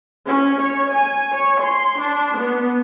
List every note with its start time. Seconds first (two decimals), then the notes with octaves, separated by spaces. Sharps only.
0.26 C#4
0.61 C#5
0.93 G#5
1.33 C#5
1.63 C6
2.00 D4
2.41 B3